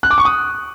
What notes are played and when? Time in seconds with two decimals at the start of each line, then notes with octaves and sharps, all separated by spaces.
0.03 F#6
0.11 D6
0.18 C#6
0.25 D#6